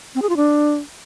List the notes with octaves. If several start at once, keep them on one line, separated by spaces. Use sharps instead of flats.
C4
G#4
F4
D4